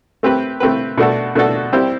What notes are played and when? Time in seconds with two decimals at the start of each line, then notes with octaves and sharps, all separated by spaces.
0.23 A3 C4 G4 B4
0.60 A3 C4 G4 B4
0.98 B2 A3 D4 F#4 A4
1.35 B2 A3 D4 F#4 A4
1.73 G3 C4 E4 G4 C5